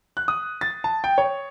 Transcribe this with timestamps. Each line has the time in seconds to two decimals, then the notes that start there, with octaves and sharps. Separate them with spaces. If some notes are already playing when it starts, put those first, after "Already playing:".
0.17 F#6
0.28 D#6
0.61 A6
0.84 A5
1.04 G5
1.18 C#5